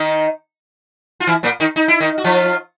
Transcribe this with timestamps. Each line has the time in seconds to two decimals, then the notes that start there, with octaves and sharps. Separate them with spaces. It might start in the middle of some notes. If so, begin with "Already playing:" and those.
Already playing: D#3 D#4
1.20 F4
1.27 E3 E4
1.43 A#2 A#3
1.60 D#3 D#4
1.76 D#4
1.88 E4
2.00 D#3 D#4
2.18 F#4
2.24 F3 F4